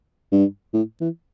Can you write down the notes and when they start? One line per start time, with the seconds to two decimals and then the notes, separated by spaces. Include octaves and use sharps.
0.32 G2
0.73 A2
1.01 E3